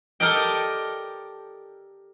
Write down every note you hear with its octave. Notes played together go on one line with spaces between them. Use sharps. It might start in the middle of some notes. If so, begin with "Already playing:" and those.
G4 A4 A#4 D5 D#5 G5